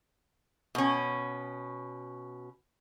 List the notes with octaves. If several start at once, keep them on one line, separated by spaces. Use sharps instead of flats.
B2 C#4